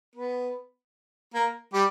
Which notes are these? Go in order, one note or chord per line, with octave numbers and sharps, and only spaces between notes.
B3 B4
A#3 A#4
G3 G4